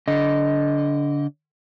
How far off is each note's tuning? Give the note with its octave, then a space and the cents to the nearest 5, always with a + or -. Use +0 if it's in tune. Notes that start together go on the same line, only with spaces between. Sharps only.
D3 -25 D#5 +0